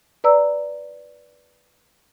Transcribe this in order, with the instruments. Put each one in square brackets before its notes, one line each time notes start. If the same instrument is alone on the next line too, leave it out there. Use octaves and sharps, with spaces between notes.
[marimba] B4 D5 A#5 E6